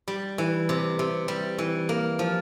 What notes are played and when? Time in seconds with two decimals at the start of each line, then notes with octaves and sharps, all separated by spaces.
0.08 G3
0.38 E3
0.69 C3
0.99 C3
1.28 G3
1.58 E3
1.89 A#3
2.19 F3